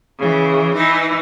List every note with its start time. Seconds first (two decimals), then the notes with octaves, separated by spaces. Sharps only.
0.18 C#3 E3
0.74 E3 D#4